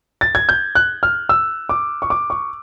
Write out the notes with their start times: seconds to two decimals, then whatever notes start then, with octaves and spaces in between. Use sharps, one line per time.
0.21 A6
0.35 G#6
0.49 G6
0.75 F#6
1.03 F6
1.29 E6
1.69 D6
2.02 C#6
2.10 D6
2.30 C#6